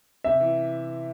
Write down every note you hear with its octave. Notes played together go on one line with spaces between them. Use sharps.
C3 E5
E3